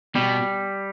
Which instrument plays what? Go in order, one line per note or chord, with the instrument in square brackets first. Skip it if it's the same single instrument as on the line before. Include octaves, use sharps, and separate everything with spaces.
[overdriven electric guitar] B2 [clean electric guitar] G3